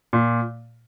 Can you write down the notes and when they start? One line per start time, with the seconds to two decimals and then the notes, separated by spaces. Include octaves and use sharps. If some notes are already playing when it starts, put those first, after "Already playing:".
0.13 A#2